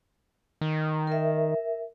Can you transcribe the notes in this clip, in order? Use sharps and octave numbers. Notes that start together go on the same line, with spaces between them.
D#3
A#4 E5